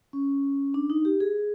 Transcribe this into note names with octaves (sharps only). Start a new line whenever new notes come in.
C#4
D4
D#4
G4
G#4